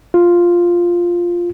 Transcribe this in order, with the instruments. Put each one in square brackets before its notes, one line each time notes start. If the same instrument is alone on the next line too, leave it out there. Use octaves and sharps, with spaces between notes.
[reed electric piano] F4